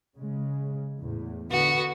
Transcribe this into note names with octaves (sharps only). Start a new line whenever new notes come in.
C#3 G#3
E2 A2
D3 B3 F#4